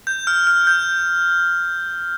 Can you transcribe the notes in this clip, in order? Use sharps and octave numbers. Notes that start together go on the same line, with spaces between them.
G6
F6
F6
G6